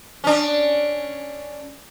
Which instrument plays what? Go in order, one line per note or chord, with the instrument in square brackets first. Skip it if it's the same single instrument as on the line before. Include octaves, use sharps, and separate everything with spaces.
[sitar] C#4 D4